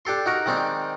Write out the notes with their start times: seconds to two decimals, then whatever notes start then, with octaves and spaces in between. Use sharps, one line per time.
0.05 D4 G4 A4 C6
0.26 D#4 F#4 A#4
0.46 D#3 G#3 C4 D4 D#4